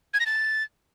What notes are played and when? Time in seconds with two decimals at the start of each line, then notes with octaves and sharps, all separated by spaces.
0.14 G#6
0.20 A#6
0.26 A6